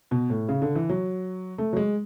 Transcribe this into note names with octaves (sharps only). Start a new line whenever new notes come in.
B2
A2
C#3
D3
E3
F#3
A3
F#3
G#3